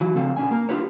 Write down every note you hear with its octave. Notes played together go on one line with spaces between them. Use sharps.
E3 F#3
C#3 F3 C4 A4 F5
B2 C#4 D4 G#5
A#3 A#4
D4 E4 F4 G4 B4 C#5